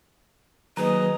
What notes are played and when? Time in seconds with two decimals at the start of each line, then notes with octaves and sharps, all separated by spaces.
0.77 D#3 F#3 A#3 G#4 B4 D#5 A#5